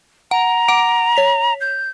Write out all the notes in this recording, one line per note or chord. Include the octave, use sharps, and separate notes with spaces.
F#5 A#5
F#5 D6 D7
C#5 B6 F7
G6